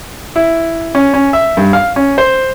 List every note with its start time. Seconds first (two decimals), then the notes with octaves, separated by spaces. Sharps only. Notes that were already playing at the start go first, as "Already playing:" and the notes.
0.36 E4
0.95 C#4
1.14 C#4
1.33 E5
1.57 G2
1.73 F5
1.96 C#4
2.18 C5